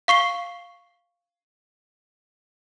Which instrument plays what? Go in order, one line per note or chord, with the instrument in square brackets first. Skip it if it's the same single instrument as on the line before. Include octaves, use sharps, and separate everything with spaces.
[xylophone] F5 C#6 C7 G7